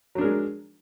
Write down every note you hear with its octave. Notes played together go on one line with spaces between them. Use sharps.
F#3 G#3 D4 A#4